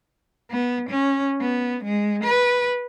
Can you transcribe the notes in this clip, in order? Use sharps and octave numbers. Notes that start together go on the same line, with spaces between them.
B3
C#4
B3
G#3
B4